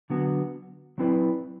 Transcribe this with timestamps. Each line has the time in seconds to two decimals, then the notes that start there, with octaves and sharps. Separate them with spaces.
0.10 D3 F#3 B3 F#4
0.98 F#3 C4 E4 B4 D5